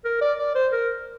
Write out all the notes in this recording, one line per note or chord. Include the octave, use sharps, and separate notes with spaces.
A#4
D5
D5
C5
A#4